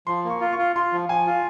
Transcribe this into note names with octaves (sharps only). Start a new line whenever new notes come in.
F3 C6
A#3
C#6
F4
C#6
F4
F4 C6
F3
F3 G#5
F4